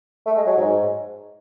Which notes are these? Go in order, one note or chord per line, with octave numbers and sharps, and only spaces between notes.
A3
G#3
F#3
G#2